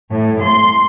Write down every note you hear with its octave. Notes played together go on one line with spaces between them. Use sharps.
A2
C6